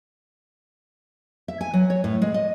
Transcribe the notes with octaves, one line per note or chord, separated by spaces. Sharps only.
E5
G#5
F#3
C#5
A2
G#3
D#5